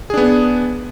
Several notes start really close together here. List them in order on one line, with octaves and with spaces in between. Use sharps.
G#4 D4 B3